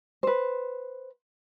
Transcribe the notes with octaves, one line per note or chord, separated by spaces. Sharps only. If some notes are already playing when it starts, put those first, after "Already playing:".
B4 C5